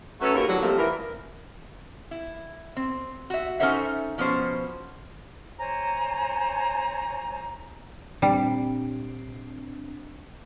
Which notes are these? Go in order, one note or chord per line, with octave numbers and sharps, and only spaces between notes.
F#3 A3 C#4 A4 B4
D#2 C#3 F#4 A#4
A2 D3 F#3
C3 F3 G3 A3 A#3
E3 A#4
E4
C4
F#4 E5
C#4 D#4 A4 C5 E5 F#5
B2 F3 B3 C#4 C5
C5 C#5 G#5 A#5
A#2 G3 C4 D4